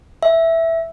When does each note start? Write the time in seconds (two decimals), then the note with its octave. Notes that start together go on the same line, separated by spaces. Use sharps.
0.23 E5